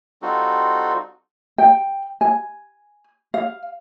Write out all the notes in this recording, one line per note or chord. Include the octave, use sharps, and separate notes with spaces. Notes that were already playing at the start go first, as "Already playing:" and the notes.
G3 C4 D#4 F4 F#4 A4
G5
G#5
F5